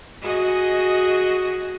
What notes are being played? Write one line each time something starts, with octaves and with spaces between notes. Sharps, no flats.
F#4 G#4 D#5